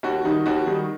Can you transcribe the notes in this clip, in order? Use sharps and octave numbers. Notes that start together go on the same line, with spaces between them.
D#2 F#4
D#3 G3 D#4
D#2 F#4
D#3 G3 D#4